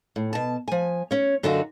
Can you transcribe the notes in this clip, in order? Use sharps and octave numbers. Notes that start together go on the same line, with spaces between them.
A2
B2 A5
F3 G#5
C#4 C#5
F#2 D3 D4 D#4 F4 F#4